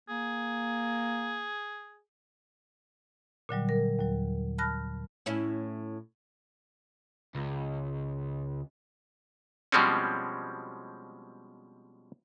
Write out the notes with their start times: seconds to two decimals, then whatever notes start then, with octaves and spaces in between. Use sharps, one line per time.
0.09 A#3 G#4
3.49 A#2 D3 F#3 G3
3.69 A#4
3.99 D#2 F#3
4.58 A5 B5 F6 F#6 A#6
5.26 A2 C#4 E4
7.35 C#2
9.72 B2 F3 G3 G#3 C4 C#4